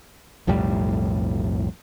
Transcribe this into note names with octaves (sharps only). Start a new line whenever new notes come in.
B1 F2 A2 G3